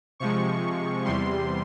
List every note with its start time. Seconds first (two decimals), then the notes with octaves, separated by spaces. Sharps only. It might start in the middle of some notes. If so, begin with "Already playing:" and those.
0.20 C3 F3 G#3 C#6
1.05 E2 C3 G3 C6